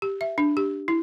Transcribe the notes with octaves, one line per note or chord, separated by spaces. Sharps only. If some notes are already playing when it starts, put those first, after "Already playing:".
G4
E5
D4
G4
E4